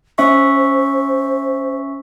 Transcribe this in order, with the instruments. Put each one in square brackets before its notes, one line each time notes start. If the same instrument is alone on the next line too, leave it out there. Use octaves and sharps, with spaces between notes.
[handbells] C#4 E5 C#6 [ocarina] C5